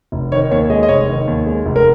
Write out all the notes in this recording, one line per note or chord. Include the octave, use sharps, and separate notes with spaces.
F1
D#3 C#5
D#2 C#5
G#3 D#5
D#5
F1 C#5
D#3
D#2
G#3
F1
A#4